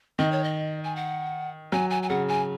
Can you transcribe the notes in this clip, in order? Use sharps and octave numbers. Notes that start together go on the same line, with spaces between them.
D#3 D#5
C#5
D#5
G#5
F#5
F#3 G#5
G#5
G#5
C#3 F#5
G#5